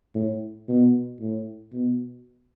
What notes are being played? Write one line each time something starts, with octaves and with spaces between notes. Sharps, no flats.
A2
B2
A2
B2